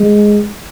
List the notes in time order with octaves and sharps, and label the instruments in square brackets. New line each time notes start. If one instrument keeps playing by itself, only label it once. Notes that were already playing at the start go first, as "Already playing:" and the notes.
Already playing: [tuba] G#3